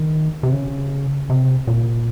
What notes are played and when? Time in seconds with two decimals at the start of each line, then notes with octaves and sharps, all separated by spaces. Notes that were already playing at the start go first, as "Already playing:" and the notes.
Already playing: D#3
0.43 C3
0.53 C#3
1.30 C3
1.67 A#2